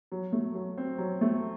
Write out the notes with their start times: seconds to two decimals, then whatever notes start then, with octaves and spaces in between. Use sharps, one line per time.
0.12 F#3
0.33 A3
0.54 F#3
0.78 C4
0.98 F#3
1.21 A3